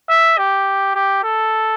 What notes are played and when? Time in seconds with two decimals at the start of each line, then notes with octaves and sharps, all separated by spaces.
0.09 E5
0.38 G4
0.95 G4
1.24 A4